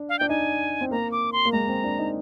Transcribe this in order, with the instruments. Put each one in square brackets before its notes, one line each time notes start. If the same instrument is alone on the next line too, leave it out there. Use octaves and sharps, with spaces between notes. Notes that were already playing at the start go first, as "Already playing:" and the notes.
Already playing: [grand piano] D4
[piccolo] F5
[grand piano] D4 [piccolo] G5
[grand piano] D#4 [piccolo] G#5
[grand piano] C4
[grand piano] A#3 [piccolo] A#5
[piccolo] D6
C6
[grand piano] A#3
[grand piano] G#3 [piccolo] A#5
[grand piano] C4
D4
D#4